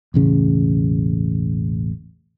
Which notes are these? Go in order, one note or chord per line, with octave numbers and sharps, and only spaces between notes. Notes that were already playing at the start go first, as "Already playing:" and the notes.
E1 A1 C#3